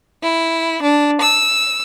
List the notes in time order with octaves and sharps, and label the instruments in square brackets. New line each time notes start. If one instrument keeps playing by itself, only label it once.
[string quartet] E4
D4
E6